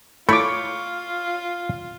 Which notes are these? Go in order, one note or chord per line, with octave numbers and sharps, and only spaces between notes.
A3 E4 F4 C#5 B5 D6